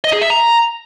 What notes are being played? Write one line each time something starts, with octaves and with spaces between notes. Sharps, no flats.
D#5
G#4
E5
A#5